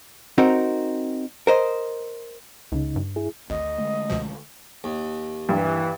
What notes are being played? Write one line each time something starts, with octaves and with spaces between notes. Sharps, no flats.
C4 D#4 F#4 A#4
A#4 C5 D#5
C#2 C#3 D#4
G2
E4 G#4
G#1 D2 D#5
D3 G#3 A3
C#2 B2 F3
D#2
G2 E3